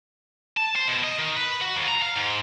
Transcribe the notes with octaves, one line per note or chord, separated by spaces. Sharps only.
A5
C5
B2
D#5
D#3
B4
F#4
D#2
A#5
F5
G#2